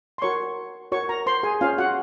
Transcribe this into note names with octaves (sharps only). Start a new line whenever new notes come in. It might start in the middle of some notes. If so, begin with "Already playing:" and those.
C6
F#4 A#4 C#5 C#6
F#4 A#4 C#5 C#6
A#4 A#5
C5 C6
G#4 G#5
C#4 F4 C5 F5
F#4 F#5